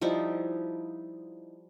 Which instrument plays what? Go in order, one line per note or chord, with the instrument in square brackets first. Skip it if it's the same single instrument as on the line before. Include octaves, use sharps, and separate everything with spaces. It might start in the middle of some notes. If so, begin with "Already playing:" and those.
[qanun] F3 G3 D#4 E4